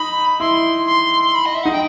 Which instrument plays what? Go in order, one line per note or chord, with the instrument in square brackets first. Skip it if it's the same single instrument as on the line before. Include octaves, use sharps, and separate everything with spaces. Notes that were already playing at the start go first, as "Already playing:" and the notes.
Already playing: [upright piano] D#4 [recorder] B5
[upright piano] E4 [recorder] C6
[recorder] C6
C6
B5
D#5
E5
[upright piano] D#4 [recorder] F#5
[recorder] G5